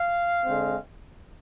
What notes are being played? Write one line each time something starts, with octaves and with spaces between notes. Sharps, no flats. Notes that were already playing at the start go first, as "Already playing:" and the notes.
Already playing: F5
D3 G#3 C4